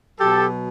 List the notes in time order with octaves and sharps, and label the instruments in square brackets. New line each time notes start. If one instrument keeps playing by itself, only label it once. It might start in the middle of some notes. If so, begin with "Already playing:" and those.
[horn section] B2 F#3 G4 A4